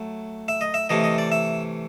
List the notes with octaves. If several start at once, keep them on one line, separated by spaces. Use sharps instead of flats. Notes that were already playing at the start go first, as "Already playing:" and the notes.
Already playing: F#3 A3
E5
D#5
E5
C3 E3 A3 C#4 D#5
D#5
D5
E5